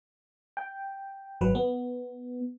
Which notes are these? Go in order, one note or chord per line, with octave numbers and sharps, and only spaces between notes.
G5
G#1 F#3 B4
B3